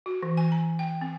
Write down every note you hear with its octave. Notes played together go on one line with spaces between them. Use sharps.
F#4
E3
G#5
A#5
G5
C4